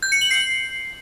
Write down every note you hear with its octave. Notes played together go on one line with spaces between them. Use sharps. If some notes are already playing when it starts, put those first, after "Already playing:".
G6
C#7
F#7
C7